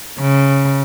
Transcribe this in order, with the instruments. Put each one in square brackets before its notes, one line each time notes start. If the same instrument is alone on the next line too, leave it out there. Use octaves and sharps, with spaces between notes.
[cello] C#3